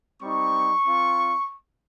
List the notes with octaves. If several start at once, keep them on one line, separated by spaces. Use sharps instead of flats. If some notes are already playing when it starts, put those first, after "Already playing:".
G3 C4 D#4 C#6
C4 F4